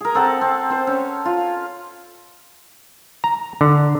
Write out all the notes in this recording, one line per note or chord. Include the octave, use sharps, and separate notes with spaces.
G#4 A#4
C4 A4 F#5 A5
C4
C4 C5
C#4
F4
A#5
D3